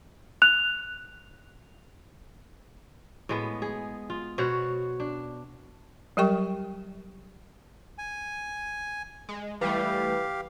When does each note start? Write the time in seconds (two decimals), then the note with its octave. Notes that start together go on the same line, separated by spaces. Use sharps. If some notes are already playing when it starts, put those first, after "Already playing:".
0.42 F#6 F7
3.29 A2 G#3 B3
3.62 G#4
4.10 F4
4.38 B2 F#4 C5 C#5
5.00 D4
6.17 F#3 G3 G4 A#4 G5 C#6
7.98 G#5
9.29 G#3
9.61 E3 G3 A3 G4 B4 F5